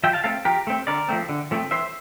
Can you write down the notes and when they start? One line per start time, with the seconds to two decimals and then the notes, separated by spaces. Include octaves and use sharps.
0.04 F3 E5 G5
0.13 F5 A5
0.24 A3 C4 F5 A5
0.45 F3 G4 A#4
0.67 A3 C4
0.87 D3 A#4 D5
1.09 F3 A3 C4
1.29 D3
1.51 F3 A3 C4
1.71 E3 C5 E5